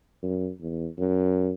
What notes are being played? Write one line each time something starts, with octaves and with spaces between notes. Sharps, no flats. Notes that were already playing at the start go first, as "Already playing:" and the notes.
F#2
E2
F#2